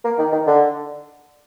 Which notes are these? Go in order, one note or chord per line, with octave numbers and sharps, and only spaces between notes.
A#3
D#3
D#3
D3